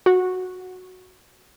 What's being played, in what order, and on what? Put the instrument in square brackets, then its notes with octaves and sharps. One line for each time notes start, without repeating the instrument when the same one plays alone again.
[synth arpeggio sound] F#4